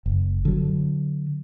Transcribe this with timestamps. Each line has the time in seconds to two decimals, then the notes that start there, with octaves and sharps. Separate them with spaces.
0.06 F#1
0.45 D3 F#3